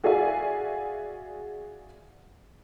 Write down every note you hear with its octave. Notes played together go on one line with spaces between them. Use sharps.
F#4 G#4 D5 E5 F5 G#5